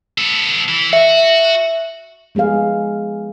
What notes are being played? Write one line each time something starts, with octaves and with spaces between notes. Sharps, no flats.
B3 A4
E3 E4
F#4 E5
F3 G#3 B3 G#4 F5